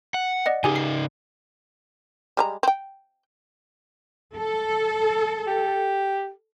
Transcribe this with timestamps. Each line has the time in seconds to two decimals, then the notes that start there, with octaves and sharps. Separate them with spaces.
0.14 F#5
0.46 D5 D#5 F#5
0.64 C#3 D#4 G4 G#4 G#5
0.76 C7
2.37 G3 G#3 A#5
2.63 C4 G5
4.35 A4
5.47 G4